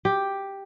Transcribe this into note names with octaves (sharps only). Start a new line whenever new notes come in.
G4